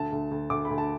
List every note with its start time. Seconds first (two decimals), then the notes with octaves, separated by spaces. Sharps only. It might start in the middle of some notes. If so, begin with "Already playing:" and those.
Already playing: D2 A5
0.12 D2
0.31 D2
0.50 D2 D6
0.65 B5
0.71 D2
0.78 A5